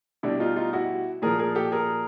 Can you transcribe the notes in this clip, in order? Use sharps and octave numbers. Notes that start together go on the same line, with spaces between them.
B2 G3 D4 E4
D#4 F4
D#4 F4
E4 F#4
A#2 F3 G#4 A#4
G#4 A#4
G4 A4
G#4 A#4